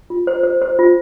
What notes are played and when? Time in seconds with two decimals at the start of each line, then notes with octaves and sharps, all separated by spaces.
0.10 F4
0.27 C5
0.43 C5
0.62 C5
0.79 F4